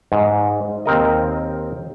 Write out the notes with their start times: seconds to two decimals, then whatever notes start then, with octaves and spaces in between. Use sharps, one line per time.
0.12 G#2
0.86 D#2 C4 A#4 D#5